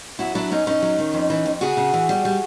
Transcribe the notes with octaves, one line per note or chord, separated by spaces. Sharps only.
F#2 E4 F#4
F#3 D4 E4
F#2 C#4 D#4
F#2 C#4 D#4
F#3
D#3
F2
E3
F2
C#3 F#4 G#4
C#3
E3
G3
G3